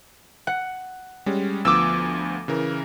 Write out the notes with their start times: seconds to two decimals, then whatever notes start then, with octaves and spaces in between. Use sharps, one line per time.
0.47 F#5
1.26 G3 G#3 C#4
1.65 D2 F3 B3 D6 E6
2.48 C#3 E3 A#4